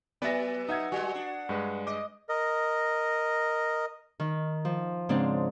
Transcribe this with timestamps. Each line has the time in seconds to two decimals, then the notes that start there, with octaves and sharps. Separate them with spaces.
0.22 F#3 B3 B4 D5 E5 A6 A#6
0.69 D#4 E5 F#5 D#6 G#6
0.92 F#3 G#3 F#4
1.15 D4
1.49 G2 G#3 B4
1.87 D#5 D6
2.29 A#4 D#5
4.20 D#3
4.65 F3
5.09 G#2 C#3 C4 D4